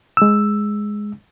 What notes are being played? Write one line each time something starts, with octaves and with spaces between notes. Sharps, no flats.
G#3 E6